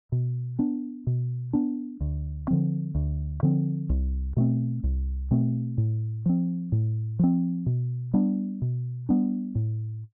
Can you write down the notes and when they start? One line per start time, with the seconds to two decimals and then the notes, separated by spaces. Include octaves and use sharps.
0.12 B2
0.59 B3 D4
1.07 B2
1.53 B3 D4
2.01 D2
2.48 D3 F3 C4
2.95 D2
3.43 D3 F3 C4
3.89 C2
4.37 B2 A3 C4
4.84 C2
5.31 B2 A3 C4
5.78 A2
6.26 F3 C4
6.72 A2
7.19 F3 C4
7.66 B2
8.14 G3 B3 D4
8.62 B2
9.09 G3 B3 D4
9.55 A2